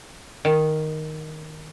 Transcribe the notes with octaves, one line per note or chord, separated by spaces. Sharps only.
D#3